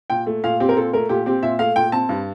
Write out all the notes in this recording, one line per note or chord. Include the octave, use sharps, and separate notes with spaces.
A#2 G5
A3
A#2 F5
C4 G4
A#4
A#2 A4
A3 A#4
A#2 G4
C4 G4
A#2 E5
A3 F5
A#2 G5
C4 A5
G2